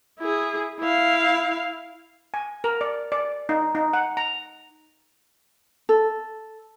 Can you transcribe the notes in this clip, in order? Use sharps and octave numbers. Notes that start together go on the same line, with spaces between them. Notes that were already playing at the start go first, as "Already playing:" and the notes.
E4 G#4
E4 F5
G#5
A#4
D5
D5
D#4
D#4
F#5
A#5
A4